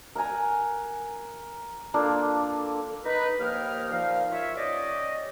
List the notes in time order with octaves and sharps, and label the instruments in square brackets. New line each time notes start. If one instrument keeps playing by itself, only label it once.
[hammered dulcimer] A#4 F#5 G#5 A#5
A#3 D4 F4 A4
[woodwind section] D#4 B4
D#2 F3 A#3 D#4 G5 F6
A#2 F3 D#4 F5
F4 C#5 E5
C#4 G4 D5 D#5